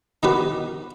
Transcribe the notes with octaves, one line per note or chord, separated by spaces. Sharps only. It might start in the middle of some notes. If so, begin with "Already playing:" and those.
D#3 B3 D#4 F#4 G4 B4